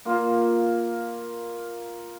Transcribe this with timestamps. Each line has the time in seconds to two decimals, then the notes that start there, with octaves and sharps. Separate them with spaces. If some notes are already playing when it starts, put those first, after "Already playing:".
0.05 A#3 F4